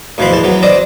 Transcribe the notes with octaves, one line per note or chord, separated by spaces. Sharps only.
D2 B2 E3 F3 C5 B5
E2 E3 A5
E3 F#3 B3
C4 D4 D5 D#5